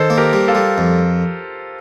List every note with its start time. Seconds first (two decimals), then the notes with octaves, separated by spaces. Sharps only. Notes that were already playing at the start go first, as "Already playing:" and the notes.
Already playing: D#3 A4 C5
0.10 A#3
0.17 G4 A#4
0.33 G3
0.48 F4 A4
0.55 G3
0.78 F2